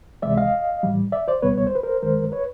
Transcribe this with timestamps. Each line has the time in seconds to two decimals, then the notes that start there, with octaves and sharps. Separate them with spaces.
0.22 C#2 C3 E3 G#3 D5 E5
0.37 D#5 F5
0.83 A2 E3 G3
1.12 D5 E5
1.28 C5 D5
1.42 C#2 B2 G3 B3 B4 C#5
1.57 C#5
1.67 C5
1.75 B4
1.83 A#4 C5
2.02 F#2 D#3 G#3 A#4 C5
2.32 B4 C#5